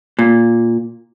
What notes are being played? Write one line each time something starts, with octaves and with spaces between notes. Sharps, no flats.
A#2